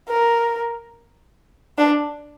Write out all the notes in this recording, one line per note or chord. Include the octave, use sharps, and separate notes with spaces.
A#4
D4